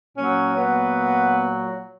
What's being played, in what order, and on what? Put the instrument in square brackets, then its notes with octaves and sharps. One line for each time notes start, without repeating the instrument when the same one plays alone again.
[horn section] A#2 F#3 C#4
B3